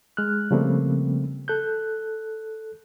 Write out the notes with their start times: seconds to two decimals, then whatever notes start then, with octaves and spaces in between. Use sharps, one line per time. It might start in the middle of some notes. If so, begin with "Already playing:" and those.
0.17 G#3 F6 F#6
0.51 C#3 F3 G3 A3 A#3 C4
1.48 A4 F#6 G6